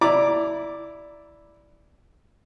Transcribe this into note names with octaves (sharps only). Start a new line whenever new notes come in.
E4 D5 A#5 D6